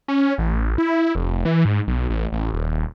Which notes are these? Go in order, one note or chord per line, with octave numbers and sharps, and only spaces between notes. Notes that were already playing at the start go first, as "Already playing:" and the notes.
C#4
A1
E4
F1
E3
G#2
B1
A1
A1
D#1